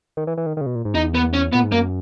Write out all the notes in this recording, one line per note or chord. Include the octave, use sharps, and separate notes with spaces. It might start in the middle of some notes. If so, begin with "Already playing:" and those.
D#3
E3
E3
D#3
D#3
C#3
B2
A#2
G#2
E2 D#4
B3
C#4
A#2 B3
G#2
F#2 A#3